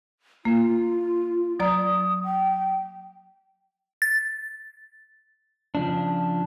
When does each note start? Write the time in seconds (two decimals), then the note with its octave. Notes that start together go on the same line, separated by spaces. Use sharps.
0.45 A#3 F4
1.60 F#3 D5 A#5 D#6
2.25 G5
4.02 A6
5.75 C#3 F3 D4